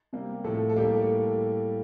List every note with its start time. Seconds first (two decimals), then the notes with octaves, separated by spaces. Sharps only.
0.13 C3 G3 A#3
0.44 A2 F3 A3 A4
0.69 A4
0.76 A2 G3 A#3 G4
0.93 A4